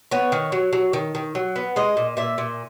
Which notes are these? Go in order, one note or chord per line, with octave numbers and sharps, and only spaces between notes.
B3 C#5
D#3
F#3
F#3
D#3
D#3
F#3
B3
G#3 D#5
A#2
A#2 E5
A#2